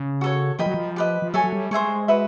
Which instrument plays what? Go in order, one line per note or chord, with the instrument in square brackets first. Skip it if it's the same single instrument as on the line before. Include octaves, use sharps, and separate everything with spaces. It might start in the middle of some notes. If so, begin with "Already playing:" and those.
Already playing: [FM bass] C#3
[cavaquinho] F#4 A4 C#5
[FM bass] F3 [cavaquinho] A#4 D#5 G5 B5
[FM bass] F#3
F3
[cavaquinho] G4 B4 D#5
[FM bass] F3
[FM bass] F#3 [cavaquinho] A4 C#5 E5 G#5
[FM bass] F#3
G3
[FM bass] G#3 [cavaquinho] C5 E5 G#5 C#6
[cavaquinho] F#4 B4 E5